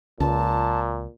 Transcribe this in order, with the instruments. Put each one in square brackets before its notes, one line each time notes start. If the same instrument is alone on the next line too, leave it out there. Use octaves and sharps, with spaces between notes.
[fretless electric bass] C#2 [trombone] A#2 [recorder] A5